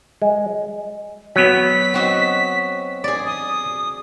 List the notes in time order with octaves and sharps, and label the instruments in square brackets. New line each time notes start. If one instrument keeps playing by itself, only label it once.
[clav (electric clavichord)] G#3
[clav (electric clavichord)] F#3 B3 [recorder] B6
[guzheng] C4 F#4 D#5
G#4 D5
[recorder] D#6